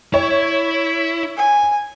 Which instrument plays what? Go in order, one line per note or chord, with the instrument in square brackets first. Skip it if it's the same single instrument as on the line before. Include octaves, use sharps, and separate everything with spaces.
[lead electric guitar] E4 [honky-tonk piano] C#5
[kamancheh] G#5